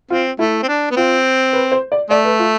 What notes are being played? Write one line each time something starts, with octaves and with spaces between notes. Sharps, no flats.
C4 F4
A3 E4
C4
D4
B3
C4 F4
B4
C5
D5
A3 D5
B4
F4